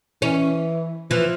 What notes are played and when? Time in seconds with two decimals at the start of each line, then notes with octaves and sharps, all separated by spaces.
0.22 E3 C#4
1.10 E3 F3